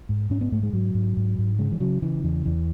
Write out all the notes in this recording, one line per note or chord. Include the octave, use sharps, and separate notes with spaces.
G#2
G#2 C#4
B3
G#2 A3
G#3
G#2 F#3
G#2
G#2
G#2
C#3 G#3
E3
C#3 F#3
C#3 E3
E2 E3
E2 E3